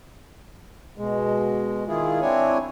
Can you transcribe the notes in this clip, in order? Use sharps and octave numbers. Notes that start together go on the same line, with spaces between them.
B2 G#3
D#3 E4 F4 G#4
C4 D4 E4 C#5 G#5